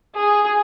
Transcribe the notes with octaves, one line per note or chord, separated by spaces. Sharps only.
G#4